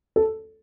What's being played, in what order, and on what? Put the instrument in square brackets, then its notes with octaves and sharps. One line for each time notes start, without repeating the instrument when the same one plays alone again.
[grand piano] A4